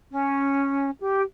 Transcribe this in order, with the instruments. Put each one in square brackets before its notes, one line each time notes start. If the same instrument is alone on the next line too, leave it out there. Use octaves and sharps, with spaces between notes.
[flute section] C#4
G4